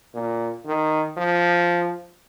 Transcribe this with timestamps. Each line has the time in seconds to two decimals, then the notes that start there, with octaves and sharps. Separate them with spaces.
0.14 A#2
0.66 D#3
1.17 F3